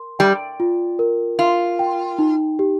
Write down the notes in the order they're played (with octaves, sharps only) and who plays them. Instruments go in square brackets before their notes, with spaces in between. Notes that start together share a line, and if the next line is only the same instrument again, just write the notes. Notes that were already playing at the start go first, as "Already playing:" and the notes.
Already playing: [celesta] A#4 C6
[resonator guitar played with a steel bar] G3 [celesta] G5
[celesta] F4
A#4
[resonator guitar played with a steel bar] F4 [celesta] C6
[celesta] G5
D#4
G4